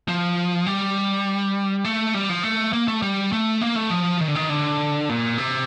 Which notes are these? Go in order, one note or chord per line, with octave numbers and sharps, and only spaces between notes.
F3
G3
A3
G3
F3
A3
A#3
A3
G3
A3
A#3
A3
F3
D#3
D3
D#3
D3
A#2
C3